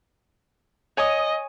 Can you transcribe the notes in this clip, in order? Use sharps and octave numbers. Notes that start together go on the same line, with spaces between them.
C#5 D#5 G#5 D#6